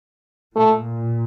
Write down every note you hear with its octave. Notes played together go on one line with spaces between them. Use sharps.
A#2 A3